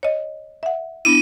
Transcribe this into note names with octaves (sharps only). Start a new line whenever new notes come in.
C#5 D#5
E5 F#5
B3 D4 E4 D#7